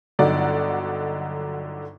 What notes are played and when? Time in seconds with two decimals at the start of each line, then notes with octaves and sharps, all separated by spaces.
0.19 G1 D3 F#3 D#4 D5 F#5